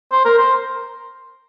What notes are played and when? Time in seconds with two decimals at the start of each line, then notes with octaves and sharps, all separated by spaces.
0.12 C5
0.25 A#4
0.39 C5